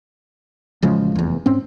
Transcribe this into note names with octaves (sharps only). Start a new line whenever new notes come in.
A1 C#3 F3 G#3
F1 E2
G#2 C4 C#4